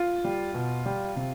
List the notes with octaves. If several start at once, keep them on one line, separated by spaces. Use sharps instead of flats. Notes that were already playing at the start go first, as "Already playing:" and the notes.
Already playing: F4
G3
B2
G3
C3